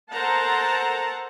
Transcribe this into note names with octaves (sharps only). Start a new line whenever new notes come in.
A4 A#4 C5 F#5 A5 A#5